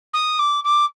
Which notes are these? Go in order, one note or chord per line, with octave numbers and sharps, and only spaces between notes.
D#6
D6
D6